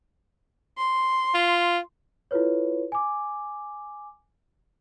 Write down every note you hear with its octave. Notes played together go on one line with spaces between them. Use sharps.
C6
F4
E4 F4 A4 B4 C#5
G#5 D6